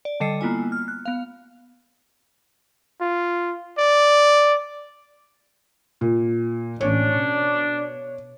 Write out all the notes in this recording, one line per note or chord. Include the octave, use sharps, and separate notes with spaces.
D5
D3 G3 A4 D#5 C7 C#7
A#3 B3 E4 F4 G#5
F6
F#6
B3 F5
F4
D5
A#2
A1 C#4 D4 C#5
B2